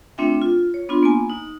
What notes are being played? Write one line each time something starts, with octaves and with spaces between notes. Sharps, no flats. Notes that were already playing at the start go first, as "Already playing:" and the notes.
A3 C4 D4 F4 E5 G5
F4
C#5
B3 D4 F4 C6
A#3 B3 G#5
D#4